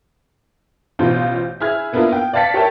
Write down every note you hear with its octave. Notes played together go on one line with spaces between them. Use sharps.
A1 B2 F4 C5 G6
E4 G#4 F6 G#6
A#3 B3 D4 E4 F4 A#4
G5
D5 F5 A5 A6 B6 C#7
G4 A#4 C#5 E5 G5 A5